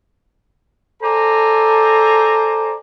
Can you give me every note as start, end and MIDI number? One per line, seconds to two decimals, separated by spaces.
1.02 2.75 69
1.02 2.75 72
1.02 2.75 74
1.02 2.75 80
1.02 2.75 82